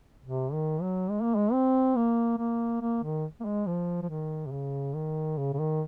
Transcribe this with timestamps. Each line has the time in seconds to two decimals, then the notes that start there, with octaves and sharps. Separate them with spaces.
0.25 C3
0.53 D#3
0.82 F#3
1.10 G#3
1.23 A#3
1.35 G#3
1.53 C4
1.96 A#3
2.38 A#3
2.81 A#3
3.03 D#3
3.40 A#3
3.45 G#3
3.67 F3
4.02 F3
4.09 D#3
4.47 C3
4.52 C#3
4.95 D#3
5.38 C#3
5.54 C#3
5.60 D#3